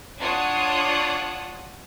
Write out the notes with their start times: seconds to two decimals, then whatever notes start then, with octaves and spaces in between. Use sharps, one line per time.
0.19 D4 F4 C#5 F#5 D#6